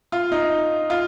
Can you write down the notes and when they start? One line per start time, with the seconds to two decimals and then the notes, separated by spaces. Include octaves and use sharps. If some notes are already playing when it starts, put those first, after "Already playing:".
0.12 F4
0.32 D#4
0.90 F4